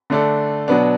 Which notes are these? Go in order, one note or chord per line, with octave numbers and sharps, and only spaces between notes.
D3 A3 D4 A4
B2 F#3 B3 D4